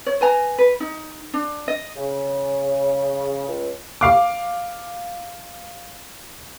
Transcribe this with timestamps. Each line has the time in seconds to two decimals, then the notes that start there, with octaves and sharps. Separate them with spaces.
0.06 C#5
0.21 B4 G#5 A#5
0.58 B4
0.80 D#4
1.34 D4
1.68 D#5
1.97 C#3
3.48 C#2
4.01 F5 D6